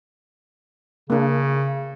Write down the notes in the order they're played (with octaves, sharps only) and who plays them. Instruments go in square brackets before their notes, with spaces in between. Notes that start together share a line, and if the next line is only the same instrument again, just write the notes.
[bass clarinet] C#3 [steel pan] A#3 D4